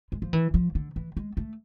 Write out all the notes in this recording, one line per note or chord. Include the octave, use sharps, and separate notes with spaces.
G#3
F3
E3
F3
D3
E3
G#3
A3